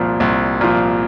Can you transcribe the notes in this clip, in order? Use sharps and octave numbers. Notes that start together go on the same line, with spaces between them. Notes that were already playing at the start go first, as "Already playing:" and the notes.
Already playing: C2 A#2 F3
C2
A#2 F3